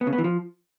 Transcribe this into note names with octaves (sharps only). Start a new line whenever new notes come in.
B3
C#3
B3
E3
F3